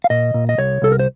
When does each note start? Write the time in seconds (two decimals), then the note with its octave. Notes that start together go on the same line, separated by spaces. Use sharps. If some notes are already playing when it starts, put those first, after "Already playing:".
0.04 F5
0.10 A#2 D#5
0.34 A#2
0.49 D#5
0.58 C2 C#5
0.82 C2 A4
0.92 A#4
0.99 C5